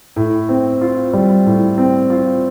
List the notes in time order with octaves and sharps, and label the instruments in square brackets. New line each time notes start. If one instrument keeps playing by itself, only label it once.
[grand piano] A2
C4
F4
G3
A2
C4
F4